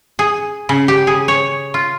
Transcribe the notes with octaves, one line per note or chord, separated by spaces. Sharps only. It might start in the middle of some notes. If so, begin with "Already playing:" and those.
G#4
C#3
G4
G#4
C#5
F4